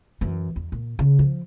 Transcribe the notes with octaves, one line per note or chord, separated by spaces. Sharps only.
F#2 E3
E2
A#2
C#3
F3